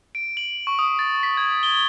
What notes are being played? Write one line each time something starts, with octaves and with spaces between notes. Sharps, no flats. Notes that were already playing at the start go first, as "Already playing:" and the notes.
D7
F#7
C#6
D#6
A6
B6
G#6
G7